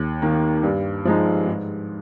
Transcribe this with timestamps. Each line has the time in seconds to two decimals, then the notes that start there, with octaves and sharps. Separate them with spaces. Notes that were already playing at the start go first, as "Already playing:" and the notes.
Already playing: D#2
0.22 D#3 A#3
0.63 G2
1.05 F3 G#3 D#4
1.47 G#2